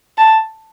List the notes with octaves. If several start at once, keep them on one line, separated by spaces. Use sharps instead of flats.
A5